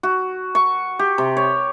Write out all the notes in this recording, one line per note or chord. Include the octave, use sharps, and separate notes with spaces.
F#4
C#6
G4
C3
C#5